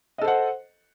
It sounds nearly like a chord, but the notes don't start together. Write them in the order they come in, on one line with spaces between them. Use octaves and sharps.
D#5 A4 C5 F#5